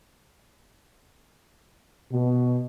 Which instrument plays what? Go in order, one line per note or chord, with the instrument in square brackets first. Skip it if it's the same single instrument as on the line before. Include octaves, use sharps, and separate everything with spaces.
[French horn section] B2